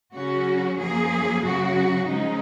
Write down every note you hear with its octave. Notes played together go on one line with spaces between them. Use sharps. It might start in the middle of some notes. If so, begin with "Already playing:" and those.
C#3 F#3 C#4 F#4
F#2 F3 A#3 G#4
F#2 C#3 F#3 F#4
C#3 F3 G#3 C#4 D#4